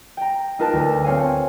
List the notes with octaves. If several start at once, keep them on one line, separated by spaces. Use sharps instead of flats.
G5 A#5
D#4 F4 A#4 B4 G5 A5
D2
C4 C5 C#5 F5 G#5